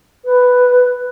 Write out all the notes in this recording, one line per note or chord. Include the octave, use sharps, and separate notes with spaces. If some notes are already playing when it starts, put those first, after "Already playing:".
B4